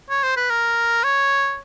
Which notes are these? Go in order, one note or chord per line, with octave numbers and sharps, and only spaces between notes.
C#5
C5
B4
A#4
C#5